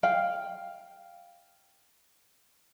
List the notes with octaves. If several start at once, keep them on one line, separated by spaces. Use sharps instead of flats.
F5 G5